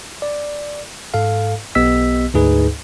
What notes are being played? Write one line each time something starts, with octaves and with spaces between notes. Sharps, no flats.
D5
G#2 A4 F5
B1 B3 G4 D#5 E6 B6
D2 G#2 D#4 G#4 B4